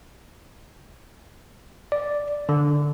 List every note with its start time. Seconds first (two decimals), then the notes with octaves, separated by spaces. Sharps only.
1.92 D5
2.49 D3